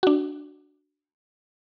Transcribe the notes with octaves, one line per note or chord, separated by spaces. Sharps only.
D4 F#4